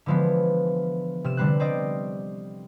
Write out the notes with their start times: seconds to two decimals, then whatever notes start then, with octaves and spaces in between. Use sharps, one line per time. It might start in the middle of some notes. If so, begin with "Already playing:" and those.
0.06 D3 E3 F3 G#3 B3
1.24 C3 F6 E7
1.37 D3 G3 B3 C4 F#6
1.60 C4 D5 D#5 G5